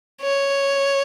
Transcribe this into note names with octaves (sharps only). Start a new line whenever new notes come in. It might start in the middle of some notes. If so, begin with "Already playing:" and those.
C#5